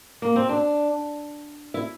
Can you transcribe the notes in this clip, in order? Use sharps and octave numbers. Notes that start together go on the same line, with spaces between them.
A#3
C4
D4
E4